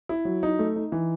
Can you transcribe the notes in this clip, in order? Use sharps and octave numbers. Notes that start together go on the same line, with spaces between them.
E4
F#3
D#4
A3
D#4
E3